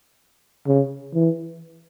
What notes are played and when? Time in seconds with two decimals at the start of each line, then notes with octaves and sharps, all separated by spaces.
0.67 C#3
1.14 E3